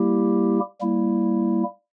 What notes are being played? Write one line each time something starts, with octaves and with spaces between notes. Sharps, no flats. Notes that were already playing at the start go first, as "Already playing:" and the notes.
Already playing: G3 A#3 E4 G4
G3 A#3 E4